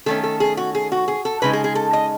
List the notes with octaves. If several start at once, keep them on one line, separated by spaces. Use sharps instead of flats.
D#3 A3 C#4 A4
A4
G#4
F#4
G#4
F#4
G#4
A4
C#3 G#3 D#4 B4
G#4
G#4
A4
D#5